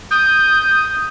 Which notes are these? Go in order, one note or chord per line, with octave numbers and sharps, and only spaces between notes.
D#6 G6